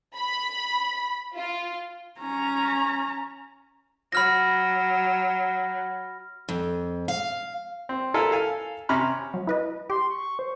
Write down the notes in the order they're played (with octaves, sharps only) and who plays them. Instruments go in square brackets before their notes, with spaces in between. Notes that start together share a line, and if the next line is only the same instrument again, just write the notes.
[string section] B5
F4
[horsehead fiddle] C#4 A#5
[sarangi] F#3 [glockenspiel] B5 F6 A#6
[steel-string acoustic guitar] F2
F5
[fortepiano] C4
E4 F4 A4 A#4 F5 G#5
A4 F5 G#5
C3 C#4 A#5 B5 F6
[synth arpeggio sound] F#3
E4 B4 D#5
[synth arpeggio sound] G4 [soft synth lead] C6
[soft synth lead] C#6
C5